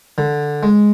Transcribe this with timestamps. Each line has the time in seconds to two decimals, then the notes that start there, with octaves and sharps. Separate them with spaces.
0.18 D3
0.63 G#3